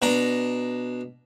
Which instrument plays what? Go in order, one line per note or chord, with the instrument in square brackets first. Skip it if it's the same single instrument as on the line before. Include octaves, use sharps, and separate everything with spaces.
[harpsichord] B2 D4 A#5